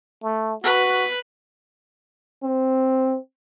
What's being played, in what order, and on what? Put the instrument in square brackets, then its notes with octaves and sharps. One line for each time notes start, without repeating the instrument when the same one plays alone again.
[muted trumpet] A3
[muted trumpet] F#4 [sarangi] B4
[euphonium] C4